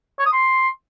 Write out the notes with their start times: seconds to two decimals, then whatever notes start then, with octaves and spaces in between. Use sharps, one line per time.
0.19 C#5
0.26 D#6
0.32 C6